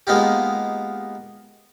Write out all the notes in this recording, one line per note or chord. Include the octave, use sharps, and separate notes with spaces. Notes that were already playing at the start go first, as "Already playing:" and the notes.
G#3 A#3 B3 D#4 F4 G4